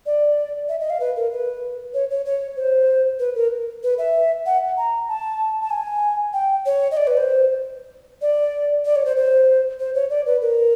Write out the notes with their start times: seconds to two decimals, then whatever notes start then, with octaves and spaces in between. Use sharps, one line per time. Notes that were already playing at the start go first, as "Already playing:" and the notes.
0.06 D5
0.69 E5
0.80 D#5
0.90 F5
1.00 B4
1.17 A#4
1.32 B4
1.94 C#5
2.10 C#5
2.25 C#5
2.57 C5
3.19 B4
3.35 A#4
3.83 B4
3.98 E5
4.46 F#5
4.77 A#5
5.09 A5
5.62 A5
5.70 G#5
6.33 G5
6.66 C#5
6.91 D#5
6.97 D5
7.07 B4
7.17 C5
8.22 D5
8.85 D5
8.96 C#5
9.05 C5
9.16 C5
9.80 C5
9.95 C#5
10.10 D5
10.26 B4
10.41 A#4